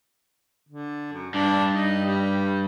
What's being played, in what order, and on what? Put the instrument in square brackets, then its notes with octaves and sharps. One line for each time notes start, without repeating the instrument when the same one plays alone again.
[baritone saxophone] D3
F#2
[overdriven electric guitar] G2 [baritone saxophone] D4
[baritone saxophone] D#4
G3